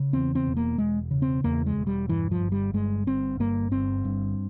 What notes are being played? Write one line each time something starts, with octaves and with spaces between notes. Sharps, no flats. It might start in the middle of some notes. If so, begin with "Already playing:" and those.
Already playing: C#3
E2 C4
C4
E1
A#3
E1 G#3
C#3
C4
E2 A#3
G#3
E1
G3
G2 E3
F3
G1
G3
G2 G#3
G1 C4
G2 A#3
G1 C4
G2